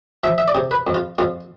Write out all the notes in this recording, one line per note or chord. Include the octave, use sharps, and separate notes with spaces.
F3 E5
E5
D5
C3
B4
F2
F4
F2 F4